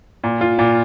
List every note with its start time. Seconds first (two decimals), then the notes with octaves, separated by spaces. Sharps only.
0.24 A#2
0.41 F4
0.59 A#2